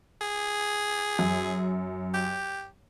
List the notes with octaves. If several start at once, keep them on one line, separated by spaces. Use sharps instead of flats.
G#4
F#2
G4